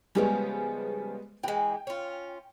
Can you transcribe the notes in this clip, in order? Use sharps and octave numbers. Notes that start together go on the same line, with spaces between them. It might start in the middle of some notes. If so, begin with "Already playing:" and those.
C#3 F3 G3 G#3 B3 C#4
E3 G#3 G5
C#4 F4